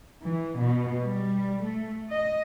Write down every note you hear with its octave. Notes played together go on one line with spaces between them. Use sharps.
E3
B2
G3
A3
D#5